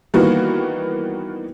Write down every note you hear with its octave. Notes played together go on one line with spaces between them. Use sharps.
D#3 E3 G3 A#3 B3 F#4